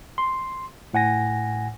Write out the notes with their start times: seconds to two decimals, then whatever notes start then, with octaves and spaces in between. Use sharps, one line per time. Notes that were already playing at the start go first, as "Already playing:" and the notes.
0.18 C6
0.94 A2 F#5 G#5 A#6